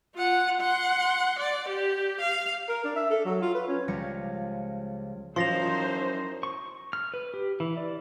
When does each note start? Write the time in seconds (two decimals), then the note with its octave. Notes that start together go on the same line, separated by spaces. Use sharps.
0.15 F4 F#5
0.60 F#5 C6
1.39 D5
1.69 G4
2.21 F5
2.69 A#4
2.85 D4
2.96 E5
3.11 A4
3.25 F#3
3.41 F4
3.55 B4
3.68 C#4
3.88 C#2 F3 G3 G#6 A#6 C#7
5.36 F#2 E3 F3 D#4 C5 C6 A#6 F7
6.43 C#6
6.93 F6
7.14 B4
7.34 G4
7.60 E3
7.77 D5